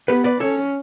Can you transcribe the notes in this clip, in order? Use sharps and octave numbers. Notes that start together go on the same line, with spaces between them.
B3 G4 B4
B4 D5
C#4 A4 C#5